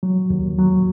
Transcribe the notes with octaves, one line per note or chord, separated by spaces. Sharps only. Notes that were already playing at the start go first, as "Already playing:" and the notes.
F#3
D#2
F#3